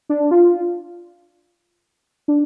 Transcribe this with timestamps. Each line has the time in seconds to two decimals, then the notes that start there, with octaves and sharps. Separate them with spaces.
0.09 D4
0.31 F4
2.28 D4